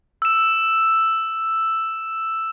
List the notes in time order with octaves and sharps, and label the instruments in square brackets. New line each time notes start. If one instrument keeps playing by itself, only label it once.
[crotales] E6 E7